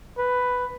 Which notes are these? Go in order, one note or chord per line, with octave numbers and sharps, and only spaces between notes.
B4